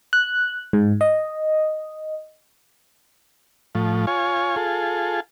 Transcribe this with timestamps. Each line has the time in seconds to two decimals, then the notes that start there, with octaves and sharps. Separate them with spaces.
0.13 F#6
0.73 G#2
1.01 D#5
3.75 A2 F3
4.07 F4 C#5 G#5
4.56 F4 G#4 A4